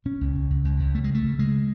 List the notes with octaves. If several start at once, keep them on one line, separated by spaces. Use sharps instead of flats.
B2 C#4
C#2
C#2
C#2
C#2
C#2
C#3 A3
G#3
C#3 A3
C#3
C#3 G#3